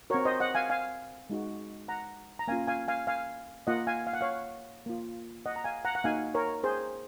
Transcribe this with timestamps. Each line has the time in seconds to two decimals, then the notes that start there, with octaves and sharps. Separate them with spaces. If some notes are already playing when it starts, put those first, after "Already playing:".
0.10 C4 F#4 A#4 C#5
0.25 C5 D#5
0.40 D#5 F#5
0.55 F5 G#5
0.70 F5 G#5
1.30 G#3 D#4 F#4
1.88 F#5 A#5
2.39 A#5
2.48 A#3 C#4 F4 F5 G#5
2.67 F5 G#5
2.88 F5 G#5
3.07 F5 G#5
3.67 A#3 F4 D#5 F#5
3.87 F5 G#5
4.07 F5
4.13 F#5
4.21 C#5 F5
4.86 A#3 F4
5.46 D#5 F#5
5.56 A#5
5.64 F5 G#5
5.85 F#5 A#5
5.95 F#5
6.04 A#3 D#4 F#4 F5 G#5
6.34 A#4 C#5
6.64 G#4 C5